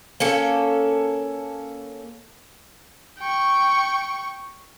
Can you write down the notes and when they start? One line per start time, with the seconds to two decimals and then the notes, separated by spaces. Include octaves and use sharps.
0.20 A#3 C#4 A4
3.19 G5 C#6